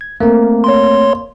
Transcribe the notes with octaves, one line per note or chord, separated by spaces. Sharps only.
G#6
A3 A#3 C4
C#5 C6